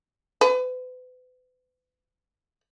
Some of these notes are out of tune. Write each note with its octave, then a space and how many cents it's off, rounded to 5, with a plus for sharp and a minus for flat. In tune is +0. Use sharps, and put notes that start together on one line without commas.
B4 +40